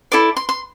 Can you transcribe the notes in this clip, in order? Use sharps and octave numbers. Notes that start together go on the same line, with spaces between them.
E4 A4 D5 D6
C6
C6